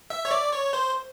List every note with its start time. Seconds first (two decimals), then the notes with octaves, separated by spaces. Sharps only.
0.10 E5
0.25 C#5
0.31 D5
0.52 C#5
0.73 C5